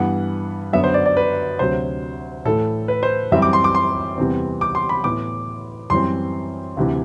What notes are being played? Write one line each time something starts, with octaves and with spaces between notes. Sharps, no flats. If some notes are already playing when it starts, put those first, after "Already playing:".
Already playing: G2 E3 B3 F#5
F#2 D3 F#3 B3 E5
C5
D5
D5
B4
D2 C3 F#3 C5
A2 E3 A3 A4
B4
C5
F#2 E3 G3 C4 E5
D6
C6
D6
C6
E2 C3 E3 G3 C4
D6
C6
B5
A2 E3 B3 D6
F#2 E3 G3 C4 C6
D2 C3 E3